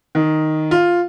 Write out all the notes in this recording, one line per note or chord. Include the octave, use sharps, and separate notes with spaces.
D#3
F4